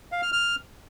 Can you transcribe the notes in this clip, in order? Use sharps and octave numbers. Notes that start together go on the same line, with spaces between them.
F5
F6
F6